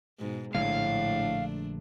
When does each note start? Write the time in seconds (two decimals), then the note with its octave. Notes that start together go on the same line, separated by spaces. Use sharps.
0.19 G#2 B2
0.55 A#1 A2 D3 G#3 A3 D4 F5